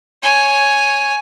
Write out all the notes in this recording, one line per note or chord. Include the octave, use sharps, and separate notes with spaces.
C#5 G#5